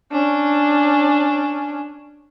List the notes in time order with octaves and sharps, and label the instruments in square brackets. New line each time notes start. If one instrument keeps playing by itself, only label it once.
[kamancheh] C#4 D4